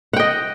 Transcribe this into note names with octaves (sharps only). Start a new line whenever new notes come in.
D#5 F#5 G5